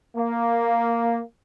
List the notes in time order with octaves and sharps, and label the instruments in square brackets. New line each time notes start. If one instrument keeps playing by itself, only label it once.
[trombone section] A#3